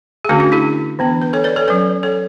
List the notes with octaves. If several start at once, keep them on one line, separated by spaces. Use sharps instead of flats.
G#4
D3 A3 C#4 D4 F#4
D4 F#4
E4 G#4
E3 B3 D4
B4
A4 C#5
B4 D5
A4 C#5
F#3 C#4 B4 D5
A4 C#5